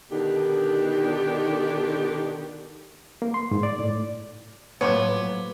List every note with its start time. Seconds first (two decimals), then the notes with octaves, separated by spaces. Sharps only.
0.11 B2 D3 D#3 D4 D#4 G4
3.22 A#3
3.34 C6
3.51 G#2
3.63 D5
3.79 A2
4.81 A2 F3 F#3 A#3 B3 C#5 D6 G#6